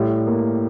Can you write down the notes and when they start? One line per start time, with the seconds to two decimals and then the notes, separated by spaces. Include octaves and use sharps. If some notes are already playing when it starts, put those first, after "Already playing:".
Already playing: A2 G3
0.27 A#3